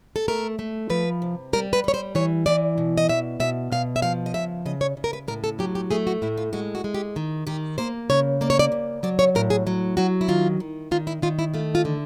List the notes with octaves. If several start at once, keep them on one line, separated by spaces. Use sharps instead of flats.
A4
A3 A#4
A3
F3 B4
C3
G3 A#4
B4
G3 C#5
C5
E3 C#5
E3 D5
B2
D#5
B2 E5
B2 E5
B2 F5
E5
F3 F5
D#5
C#3 E5
C#3 D#5
C#5
C#3
A#4
B4
A2 A#4
A4
F#3 G4
G4
A3 G#4
F#4
A2 E4
F4
G#3 F#4
F#4
G#3
G4
D#3
D#3 G4
A#3 C5
C#3 C#5
A#3 D5
C#5
D5
C#3
F#3 D5
C#5
A2 A#4
G#4
F#3
F#3 F#4
E4
D#3 F4
D#3
D#3 F4
E4
D#3 F4
E4
A3 F4
F4
D3